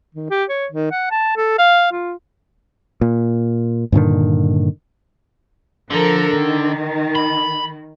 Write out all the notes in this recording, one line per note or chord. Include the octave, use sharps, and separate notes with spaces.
D#3
G4
C#5
D#3
F#5
A5
A4
F5
F4
A#2
G2 A#2 D3 D#3
D3 F3 A4 A#4
D#3
B5